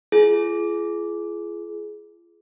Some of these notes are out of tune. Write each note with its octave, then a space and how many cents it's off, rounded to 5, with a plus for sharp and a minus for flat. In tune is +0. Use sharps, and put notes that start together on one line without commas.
F4 -40 G#4 +20